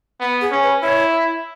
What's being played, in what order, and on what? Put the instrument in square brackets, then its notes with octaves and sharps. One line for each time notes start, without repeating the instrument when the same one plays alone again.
[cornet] B3
[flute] G#4
[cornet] C#4
[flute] B4
[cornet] E4 [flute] C#5